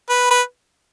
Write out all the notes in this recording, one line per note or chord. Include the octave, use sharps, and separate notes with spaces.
B4
B4